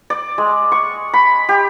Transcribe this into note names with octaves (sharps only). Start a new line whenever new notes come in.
D5
G#3
C#6
B5
G4